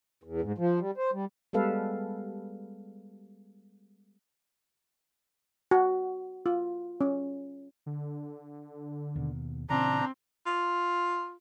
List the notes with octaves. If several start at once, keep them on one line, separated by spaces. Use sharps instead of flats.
E2
G#2
F3
G3
C5
G3
G3 G#3 B3 A4 B4 F5
F#4
F4
C#4
D3
D#2 B2
A#2 C#3 E3 C4 D4 A#5
F4